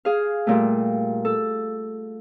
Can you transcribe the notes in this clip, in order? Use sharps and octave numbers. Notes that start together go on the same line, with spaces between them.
G#4 F5
A#2 G3 A3
A4